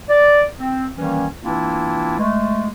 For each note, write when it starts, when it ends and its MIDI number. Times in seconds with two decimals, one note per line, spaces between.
0.10 0.42 74
0.59 0.87 60
0.96 1.26 51
0.96 1.26 52
0.96 1.26 55
0.96 1.26 58
0.96 1.26 61
1.43 2.17 52
1.43 2.17 58
1.43 2.17 60
1.43 2.17 62
1.43 2.17 64
1.43 2.17 65
2.19 2.70 56
2.19 2.70 57